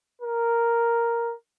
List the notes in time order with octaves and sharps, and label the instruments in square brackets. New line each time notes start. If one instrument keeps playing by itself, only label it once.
[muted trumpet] A#4